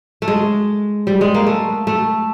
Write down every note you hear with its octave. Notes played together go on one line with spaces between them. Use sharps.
A3
G#3
G3
G#3
A#3
A3
A3